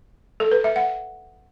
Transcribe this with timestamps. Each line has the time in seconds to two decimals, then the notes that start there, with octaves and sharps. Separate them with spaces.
0.40 A4
0.51 B4
0.64 E5
0.76 F#5